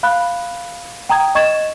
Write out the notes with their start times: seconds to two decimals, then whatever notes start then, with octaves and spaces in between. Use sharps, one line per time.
0.03 F5 B5 F#6
1.09 G5 A#5 D#6 G#6
1.35 D#5 C#6 G#6 A6 E7